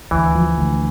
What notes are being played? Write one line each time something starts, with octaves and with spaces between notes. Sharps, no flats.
D2 E3
F3
D2